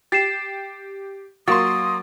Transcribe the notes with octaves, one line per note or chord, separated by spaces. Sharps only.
G4 A6 C7 E7
F#3 A#3 C6 D#6 A6